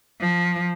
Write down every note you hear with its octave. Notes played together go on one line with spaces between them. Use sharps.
F3